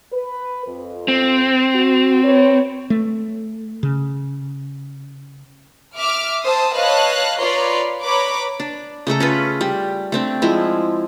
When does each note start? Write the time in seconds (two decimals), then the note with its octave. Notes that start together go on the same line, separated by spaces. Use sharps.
0.13 B4
0.67 F2
1.08 C4
1.75 F#4
2.24 B4 C#5
2.90 A3
3.83 C#3
5.97 E5 D6 F6
6.45 C5 A5 D#6 E6
6.77 B4 C#5 D#5 F5 A5 F#6
7.41 F4 B4 C#5 D5 A#5 C6
8.04 B4 C#5 A#5 B5 D6
8.60 D4
9.07 C#3 A3 A4 A#5
9.20 C#4 F4 B4
9.61 G3
10.12 A3 C4 D4
10.42 F3 G#3 E4